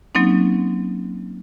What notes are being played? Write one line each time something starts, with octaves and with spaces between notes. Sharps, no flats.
F#3 A#3 C4 C#4 D#4